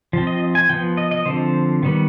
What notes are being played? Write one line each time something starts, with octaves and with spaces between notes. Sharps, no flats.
F3 C4
D#5
G#5
F3 B3 G5
D#5
D#5
D3 F3 C4 C5
D#3 G3 B3